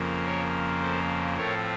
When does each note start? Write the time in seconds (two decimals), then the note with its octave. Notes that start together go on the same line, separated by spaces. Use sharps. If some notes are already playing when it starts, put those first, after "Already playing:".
Already playing: F2 C#3 F3 A#3
0.25 A#4 C#5
0.82 A4 C5
1.37 A2 F3 A3 C4 A#4 C#5